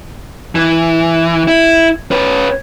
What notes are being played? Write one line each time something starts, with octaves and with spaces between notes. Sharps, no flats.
E3
E4
C#4 B4